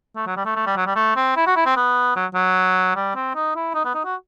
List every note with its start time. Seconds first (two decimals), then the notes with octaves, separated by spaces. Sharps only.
0.16 A3
0.27 F#3
0.37 G3
0.46 A3
0.56 A3
0.66 G3
0.76 F#3
0.87 G3
0.96 A3
1.16 C4
1.37 E4
1.47 F#4
1.56 E4
1.66 C4
1.76 B3
2.16 F#3
2.34 F#3
2.96 G3
3.15 C4
3.35 D#4
3.56 E4
3.75 D#4
3.85 B3
3.94 D#4
4.05 F#4